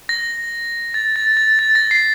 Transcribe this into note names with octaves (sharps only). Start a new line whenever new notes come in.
A#6
A6
A6
A6
A6
A#6
C7